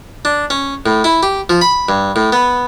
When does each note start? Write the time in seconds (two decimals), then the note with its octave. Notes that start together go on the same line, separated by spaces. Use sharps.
0.25 D4
0.50 C#4
0.86 A2
1.04 E4
1.23 G4
1.50 F3
1.61 B5
1.89 G2
2.16 A2
2.32 B3